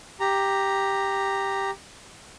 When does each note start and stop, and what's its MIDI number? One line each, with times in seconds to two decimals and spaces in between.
0.20 1.71 67
0.20 1.71 82